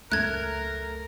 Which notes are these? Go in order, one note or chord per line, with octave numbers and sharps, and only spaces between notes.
C#2 F#2 A3 A#4 F#6 G#6